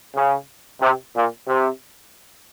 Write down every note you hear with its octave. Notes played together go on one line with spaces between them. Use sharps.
C#3
C3
A#2
C3